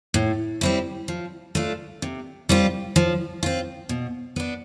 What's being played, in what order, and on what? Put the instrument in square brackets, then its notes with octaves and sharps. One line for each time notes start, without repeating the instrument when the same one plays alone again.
[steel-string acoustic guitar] A2
G3 C4 E4
F3
A3 D4 F4
C3
G3 C4 F4
F3
C4 F4
B2
B3 D4